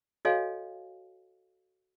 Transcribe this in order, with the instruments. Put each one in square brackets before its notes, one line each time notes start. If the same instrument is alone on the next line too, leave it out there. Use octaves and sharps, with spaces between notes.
[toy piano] F#4 A4 C#5 D#5 F5 G#5